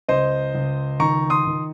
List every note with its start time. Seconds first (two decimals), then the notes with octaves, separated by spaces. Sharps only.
0.08 C#2 C5 D#5
0.55 C#2
1.00 D#3 A#5 C#6
1.30 C6 D#6
1.45 D#3